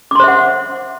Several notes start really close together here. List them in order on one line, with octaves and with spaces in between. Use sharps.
D6 C6 C5 E5 F#5